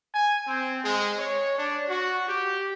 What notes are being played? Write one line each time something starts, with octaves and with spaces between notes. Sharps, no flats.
G#5
C4
G#3
C#5
D4
F#4
G4